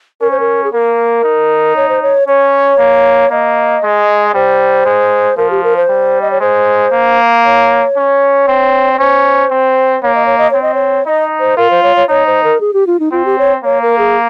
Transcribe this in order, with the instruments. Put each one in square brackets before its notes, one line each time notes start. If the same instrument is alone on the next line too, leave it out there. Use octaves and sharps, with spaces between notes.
[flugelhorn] C#4 [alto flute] A#4
[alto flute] C5
A#4
G#4
[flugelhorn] A#3 [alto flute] A#4
[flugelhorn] D#4
[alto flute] C#5
C5
C#5
[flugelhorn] C#4 [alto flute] C#5
[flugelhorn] A#3
[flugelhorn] A#3 [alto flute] D#5
[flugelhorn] G#3
[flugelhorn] G3 [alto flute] C5
[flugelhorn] G#3
[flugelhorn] F3 [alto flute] A#4
[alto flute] G4
A#4
C5
[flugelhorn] G3
[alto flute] D#5
C#5
[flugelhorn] G#3 [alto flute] C5
[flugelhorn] A#3
[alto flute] C#5
[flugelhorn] C#4
C4
[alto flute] C#5
[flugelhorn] C#4 [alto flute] C5
[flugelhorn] C4
[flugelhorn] A#3 [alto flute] C#5
[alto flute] D#5
C#5
D#5
[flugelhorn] C4 [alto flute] C#5
[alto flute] D#5
C#5
[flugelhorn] D#4 [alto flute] D#5
[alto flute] C5
[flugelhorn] F4 [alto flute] A#4
[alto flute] C5
C#5
C#5
[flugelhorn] D#4 [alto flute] C#5
[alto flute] C5
A#4
G#4
G4
F4
D#4
[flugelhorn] C4 [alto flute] F4
[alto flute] G4
C#5
[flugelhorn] A#3 [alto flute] C#5
[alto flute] A#4
G#4